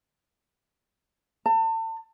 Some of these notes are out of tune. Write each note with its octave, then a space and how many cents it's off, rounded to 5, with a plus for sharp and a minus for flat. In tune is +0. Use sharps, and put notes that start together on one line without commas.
A5 +35